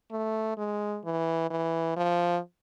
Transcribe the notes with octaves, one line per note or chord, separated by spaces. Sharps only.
A3
G#3
E3
E3
F3